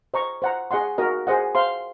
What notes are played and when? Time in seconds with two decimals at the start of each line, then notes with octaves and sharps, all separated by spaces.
0.14 C5 D#5 A#5 C#6
0.42 C5 D#5 F#5 A#5
0.71 G#4 D#5 F#5 C6
0.98 F#4 A#4 D#5
1.27 G#4 C5 D#5 F#5
1.55 C5 F5 C6